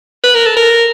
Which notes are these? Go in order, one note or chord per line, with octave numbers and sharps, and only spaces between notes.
B4
A#4
A4
A#4